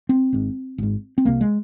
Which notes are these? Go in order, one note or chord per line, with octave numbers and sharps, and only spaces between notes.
C4
G#1 G#2
G#1 G#2
C4
C2 C3 A#3
G#3